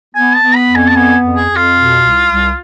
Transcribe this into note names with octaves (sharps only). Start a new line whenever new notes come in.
B3 G#5
A5
B3
B5
F2
G#5
A5
B3 G#5
F2
G#4
F2
F4
B2
C2
C2